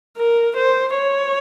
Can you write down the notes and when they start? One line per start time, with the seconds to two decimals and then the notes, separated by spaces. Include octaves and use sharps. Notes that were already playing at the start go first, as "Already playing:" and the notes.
0.17 A#4
0.57 C5
0.96 C#5